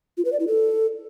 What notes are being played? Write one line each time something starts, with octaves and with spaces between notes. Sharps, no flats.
F4
B4
D5
E4
A4